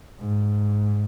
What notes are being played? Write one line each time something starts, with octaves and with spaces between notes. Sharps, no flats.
G#2